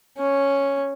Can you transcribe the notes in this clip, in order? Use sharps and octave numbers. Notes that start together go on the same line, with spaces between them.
C#4